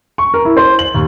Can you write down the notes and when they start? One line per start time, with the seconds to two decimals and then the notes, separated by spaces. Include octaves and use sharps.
0.18 C#6
0.34 A#4
0.45 E4
0.57 C5
0.79 F#7
0.94 D#2